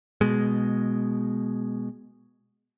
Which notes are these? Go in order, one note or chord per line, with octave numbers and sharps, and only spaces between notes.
B2 G#3